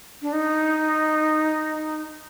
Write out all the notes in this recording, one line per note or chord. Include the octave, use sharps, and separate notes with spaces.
D4
D#4